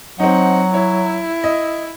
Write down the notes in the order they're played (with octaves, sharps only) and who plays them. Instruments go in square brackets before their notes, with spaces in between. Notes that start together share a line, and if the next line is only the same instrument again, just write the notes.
[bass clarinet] F#3 [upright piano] C4 D#4 [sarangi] F#5
[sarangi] E4 [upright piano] C#5
[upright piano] D#5